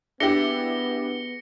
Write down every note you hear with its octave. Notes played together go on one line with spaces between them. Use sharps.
B3 D4 E4 G4 G#4 A#6 C#7 G7